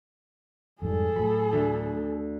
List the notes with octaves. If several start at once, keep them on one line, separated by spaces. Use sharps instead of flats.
F2 G#2 G3 G#4 A4
A2 F#3 B5
D2